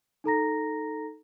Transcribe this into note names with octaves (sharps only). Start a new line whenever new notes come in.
D#4 A4 A#5 A#6